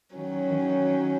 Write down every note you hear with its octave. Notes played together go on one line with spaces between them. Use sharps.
D#3 F#3 C#4